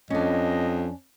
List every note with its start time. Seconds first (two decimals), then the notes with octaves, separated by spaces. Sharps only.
0.10 F2 C#4 D4 D#5